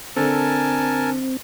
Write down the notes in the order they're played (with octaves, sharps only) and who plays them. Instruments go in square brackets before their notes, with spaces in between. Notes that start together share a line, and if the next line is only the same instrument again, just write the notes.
[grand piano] D3 A4 [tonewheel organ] C4 [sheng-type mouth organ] A#4 G#5 A5